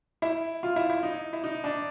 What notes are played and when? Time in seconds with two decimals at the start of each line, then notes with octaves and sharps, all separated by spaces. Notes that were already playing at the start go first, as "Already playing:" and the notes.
0.22 E4
0.63 F4
0.76 E4
0.90 E4
1.03 D#4
1.33 E4
1.44 D#4
1.64 D4